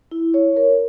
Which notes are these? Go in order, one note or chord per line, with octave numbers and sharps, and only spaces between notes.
E4
C#5
A#4